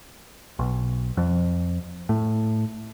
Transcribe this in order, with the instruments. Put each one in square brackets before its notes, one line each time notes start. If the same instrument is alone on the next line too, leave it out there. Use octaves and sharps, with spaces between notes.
[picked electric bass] B1
F2
A2